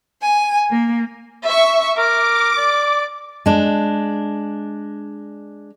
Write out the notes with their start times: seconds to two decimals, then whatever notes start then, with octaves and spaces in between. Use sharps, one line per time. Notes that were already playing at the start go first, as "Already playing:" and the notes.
0.21 G#5
0.71 A#3
1.45 E5 C#6
1.97 A#4 D6
2.57 D5
3.46 G#3 D4